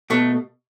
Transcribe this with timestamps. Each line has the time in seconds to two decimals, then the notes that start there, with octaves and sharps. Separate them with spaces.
0.10 B2 A3